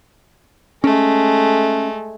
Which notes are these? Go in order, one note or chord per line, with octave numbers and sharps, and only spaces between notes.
G#3 A3 C#4